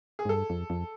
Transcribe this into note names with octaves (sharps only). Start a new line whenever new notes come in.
G#4
G#2
G2 A4
F2
F2